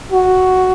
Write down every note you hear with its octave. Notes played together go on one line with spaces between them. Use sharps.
F#4